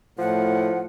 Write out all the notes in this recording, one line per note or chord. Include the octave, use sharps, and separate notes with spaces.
A2 F3 F#5